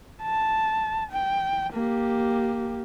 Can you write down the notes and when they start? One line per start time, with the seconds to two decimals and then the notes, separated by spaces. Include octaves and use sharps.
0.23 A5
1.11 G5
1.73 A#3 G4